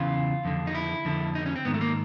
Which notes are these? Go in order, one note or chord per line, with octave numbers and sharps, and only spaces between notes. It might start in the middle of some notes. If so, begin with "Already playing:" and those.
Already playing: E2 C#3 E3 F4
F2 D3
D#4
E4
F2 D3
D#4
C#4
C4
G#2 D#3 B3
A3
A#3